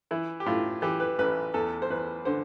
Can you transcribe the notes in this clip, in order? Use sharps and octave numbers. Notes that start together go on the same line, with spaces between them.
E3 E4
G4
A2 F4
E3 G4
B4
A1 B4
E2 A4
C5
E2 B4
D3 C5